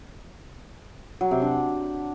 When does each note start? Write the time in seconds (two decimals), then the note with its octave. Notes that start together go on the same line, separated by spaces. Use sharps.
1.21 F#3
1.31 C3
1.42 D4